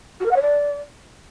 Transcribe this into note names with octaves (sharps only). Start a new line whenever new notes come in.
F#4
A#4
F#5
C#5
D5